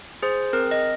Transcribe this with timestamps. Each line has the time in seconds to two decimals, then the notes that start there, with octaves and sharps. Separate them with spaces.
0.23 G#4 C5
0.53 C4 A#4
0.71 D#5